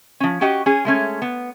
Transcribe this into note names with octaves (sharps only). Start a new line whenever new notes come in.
F3 C#4
C#4 F#4 G4 D#5
C#4 G#4
G#3 A3 C#4
B3